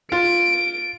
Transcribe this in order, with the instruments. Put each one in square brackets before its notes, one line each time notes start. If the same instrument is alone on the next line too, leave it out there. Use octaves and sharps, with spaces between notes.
[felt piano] F4 [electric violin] D7